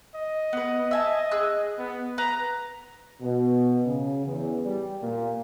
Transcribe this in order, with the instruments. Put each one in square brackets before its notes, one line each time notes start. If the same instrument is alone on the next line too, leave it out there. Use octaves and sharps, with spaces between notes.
[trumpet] D#5
[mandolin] B3 B4
E5 G#5 A5
G#4 E6 F#6
[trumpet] B3
[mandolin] B4 [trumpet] A#5
[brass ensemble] B2
C#3
E2
G3
A#2